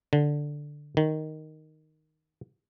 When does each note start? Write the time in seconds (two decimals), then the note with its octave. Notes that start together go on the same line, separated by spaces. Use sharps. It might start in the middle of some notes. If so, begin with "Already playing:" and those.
0.13 D3
0.97 D#3